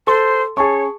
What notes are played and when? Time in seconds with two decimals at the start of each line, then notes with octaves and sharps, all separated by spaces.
0.07 A4 C5 C6
0.57 C#4 G#4 C#5 A5 C#6